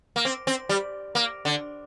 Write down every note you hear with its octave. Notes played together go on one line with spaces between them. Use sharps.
A#3
C4
C4
G3
A#3
D3